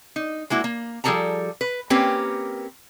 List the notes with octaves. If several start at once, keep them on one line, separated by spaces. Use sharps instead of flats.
D#4
G#3 A#3 E4 F#4
A#3
F3 G3 G#4 A4 A5 A#5
B4
A#3 C4 C#4 G4 A#4 B4